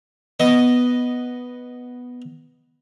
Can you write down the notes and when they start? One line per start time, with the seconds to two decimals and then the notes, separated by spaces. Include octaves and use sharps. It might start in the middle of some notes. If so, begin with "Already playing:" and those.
0.40 B3 D#5